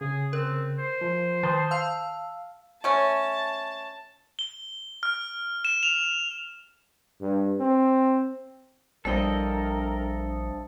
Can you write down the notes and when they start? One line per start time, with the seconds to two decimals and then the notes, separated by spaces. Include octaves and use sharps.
0.01 C#3 G#4
0.33 C4 A#4
0.78 C5
1.01 F3
1.43 D#3 A5 C6 D#6
1.71 F5 A5 E6
2.84 A3 C#4 A5
4.39 G7
5.03 F6
5.65 E7
5.83 F7
7.21 G2
7.60 C4
9.05 A#1 G2 C4 E4 A4 A#4 D#5